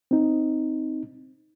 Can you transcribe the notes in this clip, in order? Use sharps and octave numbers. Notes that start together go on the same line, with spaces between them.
C4 D#4